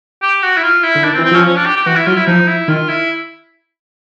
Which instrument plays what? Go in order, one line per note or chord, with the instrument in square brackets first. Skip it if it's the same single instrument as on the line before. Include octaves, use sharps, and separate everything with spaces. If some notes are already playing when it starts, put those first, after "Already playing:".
[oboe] G4
F#4
E4
F4
E4
[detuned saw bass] D3
[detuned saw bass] D#3 [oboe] D4
[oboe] C4
[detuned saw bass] E3
[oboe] C4
[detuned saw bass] F3 [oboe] C#4
[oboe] C#4
D4
G4
G4
[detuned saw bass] E3 [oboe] F#4
[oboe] E4
[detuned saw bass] F#3 [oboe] F4
[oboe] E4
[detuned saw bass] F3 [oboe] D#4
[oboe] E4
[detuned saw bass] D#3 [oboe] F4
[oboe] E4